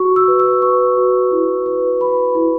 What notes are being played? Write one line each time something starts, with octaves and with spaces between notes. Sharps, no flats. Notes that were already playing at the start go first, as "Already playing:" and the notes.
Already playing: F#4 C#6
E6
B4
E6
B4 C#6
F#4
E4
B4
B4 B5
E4